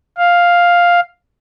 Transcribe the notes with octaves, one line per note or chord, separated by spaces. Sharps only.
F5